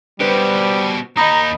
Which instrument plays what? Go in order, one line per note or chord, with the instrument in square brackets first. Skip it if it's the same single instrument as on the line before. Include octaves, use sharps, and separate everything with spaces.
[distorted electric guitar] B2 G4 [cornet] G3 [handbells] D4 B4 C5
[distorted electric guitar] D#2 D#4 [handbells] D#5 B5 D#6 [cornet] A#5